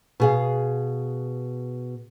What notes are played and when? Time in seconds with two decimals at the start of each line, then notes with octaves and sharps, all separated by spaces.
0.20 B2 G#4 F5